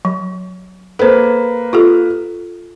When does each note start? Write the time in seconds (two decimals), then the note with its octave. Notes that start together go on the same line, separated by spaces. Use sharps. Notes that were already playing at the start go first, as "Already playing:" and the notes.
0.05 F#3
0.99 A#3 A4 B4 C5
1.73 F4 G4 A4